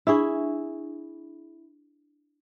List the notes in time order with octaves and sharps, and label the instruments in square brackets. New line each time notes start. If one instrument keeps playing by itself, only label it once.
[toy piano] D4 B5 C#6 [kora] E4 G#4